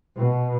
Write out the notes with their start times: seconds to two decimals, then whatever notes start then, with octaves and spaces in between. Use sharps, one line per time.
0.18 B2